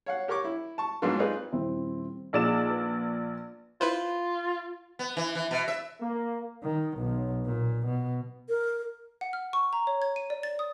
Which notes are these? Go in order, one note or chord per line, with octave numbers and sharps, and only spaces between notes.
C#5 F5 F#5
G4 A#4 C#5 C#6 D6
E4
A5 C#6
G#2 F#3 A#3 B3 D4 F4
C4 D#4 F4 G#4 A#4 B4
D#1 C4 E4
A#1 D#4 G#4 D5 E7
B4
E4 F4 B4 C5
B3
E3
E3
B2
E5
A#3
D#3
B1
A#2
B2
A#4
F#5
F6
C#6
A#5
C#5
G#6
D#7
D5
A6
D#6